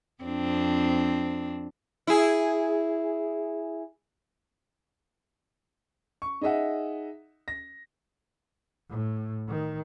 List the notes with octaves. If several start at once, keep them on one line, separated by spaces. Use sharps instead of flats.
F2 C4 D4
E4 G#4
C#6
D#4 G#4 D#5 E5 F#5
A#6
A2
D#3